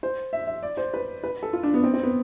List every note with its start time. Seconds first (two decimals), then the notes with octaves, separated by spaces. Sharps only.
0.03 C5
0.33 E5
0.47 E5
0.63 D5
0.77 C5
0.94 B4
1.24 B4
1.43 A4
1.53 F4
1.63 D4
1.74 B3
1.84 C4
1.94 C4
2.03 B3